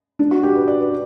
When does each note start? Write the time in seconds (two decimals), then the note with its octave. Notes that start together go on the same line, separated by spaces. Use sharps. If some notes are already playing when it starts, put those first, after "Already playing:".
0.19 D4
0.31 F#4
0.43 G4
0.55 B4
0.68 D5
0.80 B4